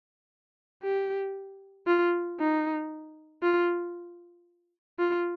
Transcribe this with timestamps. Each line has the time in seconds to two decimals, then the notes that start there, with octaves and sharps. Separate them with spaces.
0.83 G4
1.87 F4
2.39 D#4
3.42 F4
4.99 F4